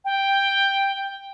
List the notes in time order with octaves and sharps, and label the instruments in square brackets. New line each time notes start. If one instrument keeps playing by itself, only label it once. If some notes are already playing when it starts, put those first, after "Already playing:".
[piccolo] G5